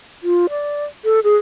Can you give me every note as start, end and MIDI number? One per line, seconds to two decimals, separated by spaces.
0.23 0.46 65
0.50 0.84 74
1.05 1.20 69
1.24 1.36 68